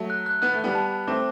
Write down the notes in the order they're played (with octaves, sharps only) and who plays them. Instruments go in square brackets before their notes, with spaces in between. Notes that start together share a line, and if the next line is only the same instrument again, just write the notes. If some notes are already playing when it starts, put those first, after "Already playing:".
Already playing: [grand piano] F#3 A3
[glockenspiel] F#6
F#6
[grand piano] B3 [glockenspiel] F#6
[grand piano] A3
[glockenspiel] F#6
[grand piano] G3 B3
[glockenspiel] A5
A5
[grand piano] A3 C4 [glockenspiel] D6